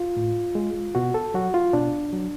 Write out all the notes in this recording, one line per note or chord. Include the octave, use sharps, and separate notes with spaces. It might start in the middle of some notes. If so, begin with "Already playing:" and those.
Already playing: F4
A2
G#3
B2 F#4
A4
F#3 F#4
F4
B2 D4
F#3